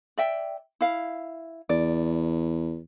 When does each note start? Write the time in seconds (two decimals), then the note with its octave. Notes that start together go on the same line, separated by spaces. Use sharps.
0.18 D5 E5 G5
0.81 E4 F5
1.69 E2 D5